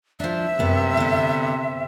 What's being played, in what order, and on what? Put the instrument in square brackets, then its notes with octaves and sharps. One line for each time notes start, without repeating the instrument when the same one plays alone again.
[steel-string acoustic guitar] F3 D4 [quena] E5
[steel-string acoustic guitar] F#2 B3 [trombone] C3
[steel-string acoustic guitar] D3 B3